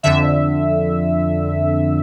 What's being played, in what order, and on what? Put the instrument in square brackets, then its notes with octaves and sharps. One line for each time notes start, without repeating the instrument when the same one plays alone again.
[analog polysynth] F2 D3 E5